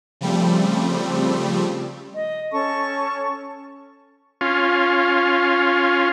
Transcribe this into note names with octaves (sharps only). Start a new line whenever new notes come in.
C#3 F3 G3 A3 C4
D#5
C#4 A4 A5 C#6
C#4 F4